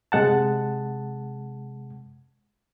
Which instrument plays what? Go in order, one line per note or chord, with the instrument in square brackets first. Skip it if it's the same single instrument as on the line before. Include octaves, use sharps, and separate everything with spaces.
[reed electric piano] C3 G#3 F#5 A5